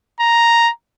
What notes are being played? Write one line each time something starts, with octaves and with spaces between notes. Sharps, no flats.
A#5